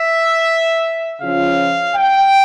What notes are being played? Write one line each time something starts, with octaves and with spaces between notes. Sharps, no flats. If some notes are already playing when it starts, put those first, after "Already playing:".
Already playing: E5
C#3 F3 C#4 F4 F5
G5